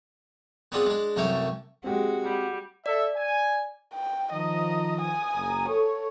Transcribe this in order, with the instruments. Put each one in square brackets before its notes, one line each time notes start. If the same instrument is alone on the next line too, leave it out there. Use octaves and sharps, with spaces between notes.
[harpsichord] B3 C4 D4 F4 G#4
G#3 D4
C2 F#2 E3 A3 C#5 G5
[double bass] G#3 [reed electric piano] C4 G4 [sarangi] F#4
[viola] G3
[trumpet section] A4 E5 [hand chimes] D5
[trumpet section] G#5
[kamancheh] G5
[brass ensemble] D#3 F3 [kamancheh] D#5 A#5
[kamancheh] G#5 D#6
[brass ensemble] F#1 A#5
[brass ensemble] A4 [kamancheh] C#5